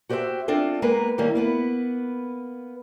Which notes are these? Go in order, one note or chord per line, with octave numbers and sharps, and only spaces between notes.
F#4 G4 C5 C#5 E5 G5
C4 D4 F4 A4
G#3 A#3 B3 A#4 B4
D#3 E3 G3 A#3 C#4
A#3 B3 B4